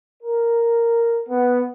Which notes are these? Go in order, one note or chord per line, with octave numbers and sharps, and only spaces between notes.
A#4
B3